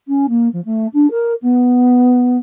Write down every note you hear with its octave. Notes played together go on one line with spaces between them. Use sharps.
C#4
A#3
F3
A3
D4
A#4
B3